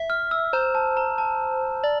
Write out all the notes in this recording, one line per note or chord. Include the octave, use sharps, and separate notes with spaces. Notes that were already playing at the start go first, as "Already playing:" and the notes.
Already playing: E5
F6
E6
C5 A#5
A5
A#5
A5
D5